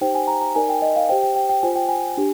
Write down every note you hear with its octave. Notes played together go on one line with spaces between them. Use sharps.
D#4 G4 C5 G5
G#5
A#5
A#5
D#4 A#4 D5 G#5
G5
D#5
F5
G4 C5 G5
G5
G5
G5
F4 C5 G#5
G5
G#5
D4 G4